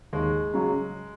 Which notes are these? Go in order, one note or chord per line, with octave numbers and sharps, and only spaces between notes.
D#2 G#3
C#3 F#3